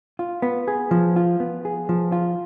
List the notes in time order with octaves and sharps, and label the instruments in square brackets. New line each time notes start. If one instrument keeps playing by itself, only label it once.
[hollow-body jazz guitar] F4
B3
G#4
F3
F4
B3
G#4
F3
F4